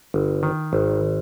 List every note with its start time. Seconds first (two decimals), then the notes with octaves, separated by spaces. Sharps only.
0.14 G1
0.43 D#3
0.73 G#1